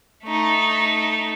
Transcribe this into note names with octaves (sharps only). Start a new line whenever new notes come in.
A3 D#4